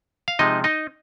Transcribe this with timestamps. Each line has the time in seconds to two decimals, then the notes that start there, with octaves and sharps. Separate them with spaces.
0.28 F5
0.39 C3 F3 G#3 D#4 D#5
0.64 D#4 D#5